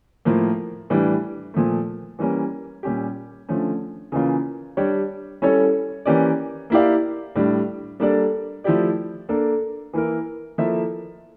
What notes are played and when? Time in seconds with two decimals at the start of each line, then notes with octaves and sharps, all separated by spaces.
0.25 A2 F3 A#3
0.90 A2 E3 G3 D4
1.54 A#2 F3 A3
2.19 E3 G3 A#3 C#4
2.83 A#2 G3 C#4 G4
3.49 D3 F3 A3 C#4
4.12 C#3 E3 A#3 C#4 F4
4.77 G3 D4 G4 C#5
5.42 G3 C#4 E4 A4 C#5
6.05 E3 A#3 C#4 G4 D5
6.70 A#3 E4 G4 D5 F5
7.36 A2 G3 D4
8.00 G3 A#3 D4 A4 D5
8.64 F3 A3 E4 G4 D5
9.29 A#3 D4 A4
9.93 E3 A#3 E4 A#4
10.58 F3 A#3 E4 A4 E5